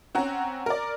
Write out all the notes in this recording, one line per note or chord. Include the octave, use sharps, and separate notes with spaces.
C4 C#4 F#5 A#5
A#4 D5